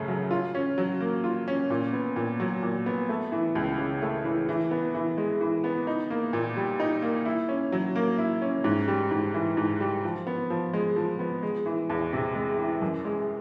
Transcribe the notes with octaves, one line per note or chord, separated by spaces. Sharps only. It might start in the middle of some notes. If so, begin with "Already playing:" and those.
Already playing: F#2 C#3 A3
F#3
F4
C#4
F#3
A#3
F4
C#4
A#2
B3
A#2
F#3
A#2
B3
A3
E3
C#2
C#3
A3
E3
E3
B3
E3
G#3
E3
B3
D#4
A#3
A#2
G3
D#4
A#3
E4
C#4
F#3
A#3
E4
C#4
G#2
G3
G#2
E3
G#2
G3
F3
B3
F3
G#3
F3
B3
G#3
E3
E2
C3
G#3
E3
F#2
G#3